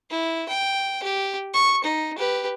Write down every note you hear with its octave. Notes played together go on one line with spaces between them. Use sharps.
E4
G5
G4
C#6
D#4
G4 B4